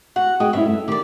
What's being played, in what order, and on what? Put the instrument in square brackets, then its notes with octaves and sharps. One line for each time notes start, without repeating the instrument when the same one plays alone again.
[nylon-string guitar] F#4 [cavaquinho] F#5
[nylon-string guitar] F#4 G#4 G5 [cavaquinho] D#5
[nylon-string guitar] G2 C#4 E4 [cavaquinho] E5
[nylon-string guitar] A3
[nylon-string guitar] D#3 [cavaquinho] G4 D5